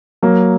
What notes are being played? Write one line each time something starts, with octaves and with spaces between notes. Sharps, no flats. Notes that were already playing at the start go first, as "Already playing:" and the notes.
F#3 A#3